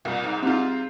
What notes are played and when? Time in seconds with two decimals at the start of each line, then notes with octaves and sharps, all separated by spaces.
0.05 C2 A#2
0.24 G#2
0.42 G#2 C3 G3 C4 F4